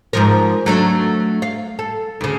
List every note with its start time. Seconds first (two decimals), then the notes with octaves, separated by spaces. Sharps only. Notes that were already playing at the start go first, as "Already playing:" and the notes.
0.13 G#2 F3 A#4
0.66 F#3 A3 D4
1.42 F5
1.79 A4
2.21 D2 C#3